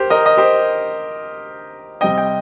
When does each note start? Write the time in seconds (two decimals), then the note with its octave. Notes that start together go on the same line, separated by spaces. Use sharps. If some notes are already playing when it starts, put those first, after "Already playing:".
Already playing: G4 A#4 C5
0.10 A#4 D#5
0.26 D#5
0.37 G4 C5
2.01 C3 G3 C4 D#5 G5
2.18 G5